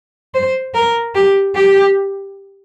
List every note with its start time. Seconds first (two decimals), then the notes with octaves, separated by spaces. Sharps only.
0.34 C5
0.75 A#4
1.15 G4
1.56 G4